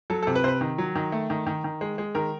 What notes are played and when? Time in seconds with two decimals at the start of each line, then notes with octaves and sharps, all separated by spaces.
0.10 F#3 A4
0.23 A4
0.27 C3
0.35 B4
0.44 C3 C5
0.48 B4
0.61 D#3
0.78 F#3
0.95 D#3
1.12 A3
1.30 D#3
1.47 D#3
1.64 D#3
1.81 G#3
1.98 G#3
2.15 D#3 A#4